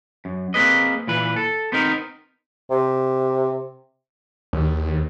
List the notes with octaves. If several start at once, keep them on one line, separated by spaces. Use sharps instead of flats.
F#2
A#3 C4 G#4 B4 D#5
A#2 E3 B4
A4
B3 C4 D#4 A#4
C3
D#2